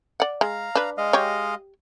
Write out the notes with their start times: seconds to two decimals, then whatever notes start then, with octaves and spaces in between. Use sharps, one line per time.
0.20 D5 F#5
0.41 G#3 F5 A#5
0.75 D4 B4
0.98 G#3 D#5 F5
1.13 G4 C#5